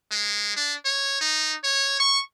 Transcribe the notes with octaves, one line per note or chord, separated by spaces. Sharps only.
G#3
D4
C#5
D#4
C#5
C#6